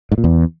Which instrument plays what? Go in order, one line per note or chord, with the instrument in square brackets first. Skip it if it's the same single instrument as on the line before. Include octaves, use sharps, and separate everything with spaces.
[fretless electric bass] G#2
A#2
E2